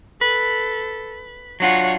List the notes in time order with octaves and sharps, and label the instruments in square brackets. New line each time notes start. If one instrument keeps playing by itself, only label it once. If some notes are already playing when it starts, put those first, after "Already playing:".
[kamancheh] A4 [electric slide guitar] B4
[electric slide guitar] F#3 D4 F4 [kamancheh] C#5 F#5